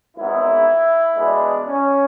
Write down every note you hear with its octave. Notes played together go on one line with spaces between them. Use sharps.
G#1 G#2 G#3 B3 E4
E2 B2 G#3 B3 D4
C#4